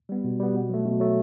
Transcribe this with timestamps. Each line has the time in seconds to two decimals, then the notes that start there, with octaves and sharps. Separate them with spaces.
0.09 G3 B3
0.24 B2
0.40 G3 B3
0.54 B2
0.70 F#3 A3
0.85 B2
1.00 F#3 A3